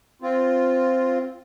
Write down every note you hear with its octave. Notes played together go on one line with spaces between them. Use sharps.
C4 F4